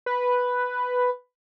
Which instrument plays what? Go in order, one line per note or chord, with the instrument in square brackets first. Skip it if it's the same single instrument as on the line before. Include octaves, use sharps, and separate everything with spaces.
[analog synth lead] B4